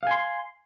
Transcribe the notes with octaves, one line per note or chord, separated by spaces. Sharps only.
F5 G#5 C6